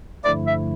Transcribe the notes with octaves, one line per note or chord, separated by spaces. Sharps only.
G2 D3 F3 A3 E4 D5
E5